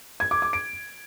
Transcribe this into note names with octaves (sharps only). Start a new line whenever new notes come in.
G#6
D6
D6
D7